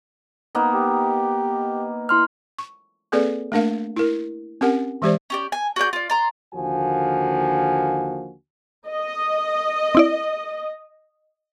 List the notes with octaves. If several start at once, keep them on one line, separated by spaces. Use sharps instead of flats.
A#3 B3 D#4
G4
E4 C6 F6
C#6
A#3 C4 G#4 A4 B4 D5
A3 A#3 D4 A#4 F5
E4 A#4
C4 C#4 G4 A#4 F#5
E3 G#3 G4 C5 D5
C#4 G4 D5
G#5
F#4 G#4 D5 G6
F4 D5
D5 A#5 C6
D#2 D3 F3 A#3 F#4 G#5
D#5
C4 E4 D5